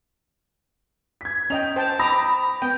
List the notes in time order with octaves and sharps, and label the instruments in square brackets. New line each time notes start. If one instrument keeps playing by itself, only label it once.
[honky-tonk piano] G#6 B6
[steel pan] C#4 D#5 G5 [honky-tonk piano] F7
[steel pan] C5 G5 A5
[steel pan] A#5 D6 [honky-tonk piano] B5 D#6 A#6
[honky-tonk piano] B3 [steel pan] G5